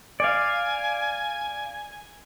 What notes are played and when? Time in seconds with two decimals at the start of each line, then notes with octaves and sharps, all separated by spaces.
0.20 D5 F5 G#5